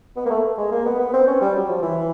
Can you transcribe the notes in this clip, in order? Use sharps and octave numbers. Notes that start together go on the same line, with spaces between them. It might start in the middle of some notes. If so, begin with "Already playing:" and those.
B3
A#3
A3
G#3
A#3
B3
B3
C4
C#4
G3
F#3
F3
E3